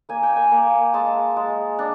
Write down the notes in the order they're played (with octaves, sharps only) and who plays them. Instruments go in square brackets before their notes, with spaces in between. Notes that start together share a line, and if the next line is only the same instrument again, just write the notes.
[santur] A#3 G#5
G5
G#5
A#3
G#3 A5
G#3
D4